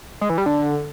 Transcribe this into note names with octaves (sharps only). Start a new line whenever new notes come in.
G#3
E3
G3
D3